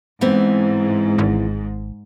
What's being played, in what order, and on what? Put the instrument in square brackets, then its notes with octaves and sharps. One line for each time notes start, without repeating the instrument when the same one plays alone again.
[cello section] G#2 [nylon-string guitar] E3 B3 C4
[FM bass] G#1